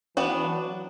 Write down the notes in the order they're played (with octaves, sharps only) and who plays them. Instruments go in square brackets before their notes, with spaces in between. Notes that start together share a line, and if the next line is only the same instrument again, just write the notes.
[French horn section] E3 [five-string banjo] B3 D4 F#4
[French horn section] F#3